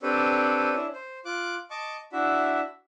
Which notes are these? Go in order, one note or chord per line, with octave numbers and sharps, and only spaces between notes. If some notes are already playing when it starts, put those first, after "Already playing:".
C4 D4 G4 A4 B4 C#5
C#4 D4 E4
C5
F4 D6 F#6
D#5 A5 C#6 D6
D4 E4 F#4 E5